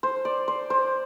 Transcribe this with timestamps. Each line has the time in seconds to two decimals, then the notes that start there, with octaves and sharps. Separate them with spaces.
0.03 C5
0.25 D5
0.48 C5
0.70 C5